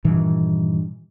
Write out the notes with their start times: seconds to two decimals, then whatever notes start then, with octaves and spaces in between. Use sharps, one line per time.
0.04 G2 A#2 D#3 E3